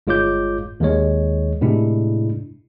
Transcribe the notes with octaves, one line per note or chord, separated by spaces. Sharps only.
G1 G#3 F4 C#5 D6 G6
D#2 D#3 G#3 C#5
A2 C3 G#3 D4 E4